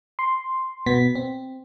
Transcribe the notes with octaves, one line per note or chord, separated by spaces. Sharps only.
C6
B2 B3 B6
C4